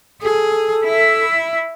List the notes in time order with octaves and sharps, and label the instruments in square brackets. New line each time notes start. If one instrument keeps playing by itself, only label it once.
[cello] G#4 [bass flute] A4
[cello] E4 E5